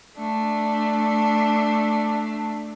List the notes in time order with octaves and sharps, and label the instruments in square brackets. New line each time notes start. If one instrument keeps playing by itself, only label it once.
[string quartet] A3 D4